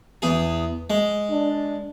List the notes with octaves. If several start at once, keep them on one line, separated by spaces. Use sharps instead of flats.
E2 G#4
G#3
D4